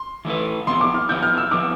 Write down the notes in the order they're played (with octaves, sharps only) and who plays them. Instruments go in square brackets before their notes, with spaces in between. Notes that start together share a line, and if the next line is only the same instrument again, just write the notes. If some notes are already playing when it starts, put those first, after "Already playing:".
Already playing: [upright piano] C6
[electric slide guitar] E3 A3 E4 B4
[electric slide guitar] F3 B3 E4 [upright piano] C6
[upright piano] D6
F6
[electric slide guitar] F3 B3 E4 [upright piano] G6
[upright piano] F6
E6
[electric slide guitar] F3 B3 E4 [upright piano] D6